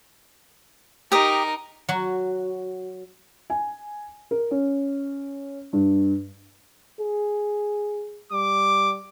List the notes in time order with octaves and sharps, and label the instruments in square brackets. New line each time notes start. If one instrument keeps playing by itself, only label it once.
[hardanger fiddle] D#4 A#4 [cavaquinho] G4 D#6
[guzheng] F#3 F#4
[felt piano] G#5
A#4
C#4
G2
[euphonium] G#4
[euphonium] G3 [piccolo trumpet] D6